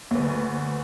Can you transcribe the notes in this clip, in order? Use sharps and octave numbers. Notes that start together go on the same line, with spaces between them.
D2 B4